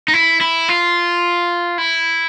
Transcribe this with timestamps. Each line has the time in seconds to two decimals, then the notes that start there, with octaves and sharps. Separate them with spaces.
0.08 D#4
0.14 E4
0.41 E4
0.69 F4
1.78 E4